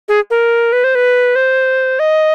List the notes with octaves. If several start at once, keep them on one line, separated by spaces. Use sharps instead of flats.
G#4
A#4
B4
C5
B4
C5
D#5